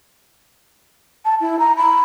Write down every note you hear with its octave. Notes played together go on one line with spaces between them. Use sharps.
A5
E4
A#5
B5